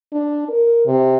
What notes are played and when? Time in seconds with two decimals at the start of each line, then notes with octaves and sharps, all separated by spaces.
0.13 D4
0.48 A#4
0.86 C3